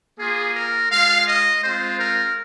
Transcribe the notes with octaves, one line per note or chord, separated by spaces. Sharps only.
A#3 F4 G#4
A#4
G#3 F4 F5
D#5
G#3 C4 F4 C5
A#4